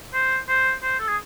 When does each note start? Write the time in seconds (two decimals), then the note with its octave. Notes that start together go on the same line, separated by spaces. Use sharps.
0.14 C5
0.48 C5
0.83 C5
1.00 A4
1.08 G#4